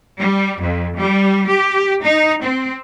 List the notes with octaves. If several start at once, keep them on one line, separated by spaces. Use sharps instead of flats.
G3
F2
G3
G4
D#4
C4